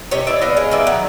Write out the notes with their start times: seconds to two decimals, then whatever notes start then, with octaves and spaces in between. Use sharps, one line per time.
0.11 C3 C#5 D#5
0.27 E3 D5 E5
0.42 B3 D#5 F5
0.57 G#3
0.71 D#3 D5 E5
0.87 F#3